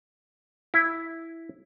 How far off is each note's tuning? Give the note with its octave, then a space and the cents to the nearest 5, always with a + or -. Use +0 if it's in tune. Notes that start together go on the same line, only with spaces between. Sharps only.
E4 +0